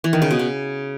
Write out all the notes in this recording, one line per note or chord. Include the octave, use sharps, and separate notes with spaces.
E3
D#3
C#3
B2
C#3